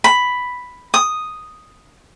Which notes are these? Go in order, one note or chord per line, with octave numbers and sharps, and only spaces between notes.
B5
D#6